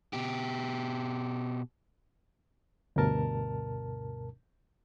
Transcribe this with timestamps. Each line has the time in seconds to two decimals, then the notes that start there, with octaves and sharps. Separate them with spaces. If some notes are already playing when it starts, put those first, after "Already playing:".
0.13 B2 G4
2.96 D2 G2 B2 A#4 A5